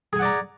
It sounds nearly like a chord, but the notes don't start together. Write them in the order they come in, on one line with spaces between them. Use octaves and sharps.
G#4 G#5 F#5 D5 A#5